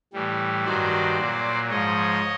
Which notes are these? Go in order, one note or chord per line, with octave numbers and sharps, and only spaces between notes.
A2 E3 G3
G2 D#3 F#3 C5 D5
A#2 F#3
G#2 F3 C#5 D#5